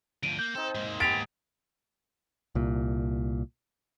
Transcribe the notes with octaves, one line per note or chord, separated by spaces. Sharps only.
D2 F3 D7 D#7
A#3 G6
C4 D#4 A4
G#2 G#3 A#3
B3 G4 G#4 A6 B6 D7 F7
C2 A#2